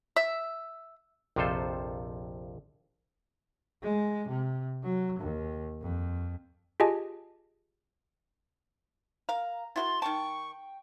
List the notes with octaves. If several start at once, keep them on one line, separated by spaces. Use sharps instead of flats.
E5
A#1 F2 C3 F4 A4 C5
G#3
C3
F#3
D#2
F2
F4 G4 G#4 D#5 G#5 A5
A#4 F5 A#5
E4 F#4 A#4 C6 A6
D#3 G5 A5 C#6